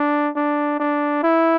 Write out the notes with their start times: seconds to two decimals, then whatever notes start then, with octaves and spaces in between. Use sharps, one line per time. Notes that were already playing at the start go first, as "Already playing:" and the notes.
Already playing: D4
0.36 D4
0.80 D4
1.23 E4